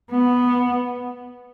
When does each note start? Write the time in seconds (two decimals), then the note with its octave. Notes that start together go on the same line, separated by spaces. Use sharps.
0.11 B3